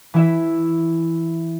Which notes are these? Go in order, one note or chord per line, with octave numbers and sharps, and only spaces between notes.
E3 E4 E5